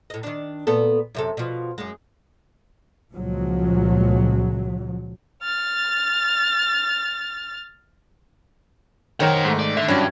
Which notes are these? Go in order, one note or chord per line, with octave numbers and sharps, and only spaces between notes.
A2 D#5
D#3 D4
A#2 B3 A4
F#2 C3 A4
B2 F3
F#2 G#3
C#2 A#2 F3 F#3
F6 A6
D#3 A#4 C5 C#5 F#5 G5
G#2 A3
D5
D3 E5
G2 F#3 C#4 D4 E4 G#6